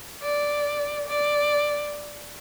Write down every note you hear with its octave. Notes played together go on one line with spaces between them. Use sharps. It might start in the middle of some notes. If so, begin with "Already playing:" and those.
D5
D5